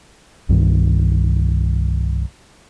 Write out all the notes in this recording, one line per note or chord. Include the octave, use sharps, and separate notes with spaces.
C2 G2 D#3